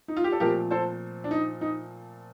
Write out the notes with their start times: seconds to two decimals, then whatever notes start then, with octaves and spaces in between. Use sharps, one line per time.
0.08 D#4
0.16 F4
0.24 G4
0.32 A4
0.40 A#2 F3 A3 C4 G4 A#4
0.71 A4 C5
1.24 D4
1.31 D#4
1.61 D#4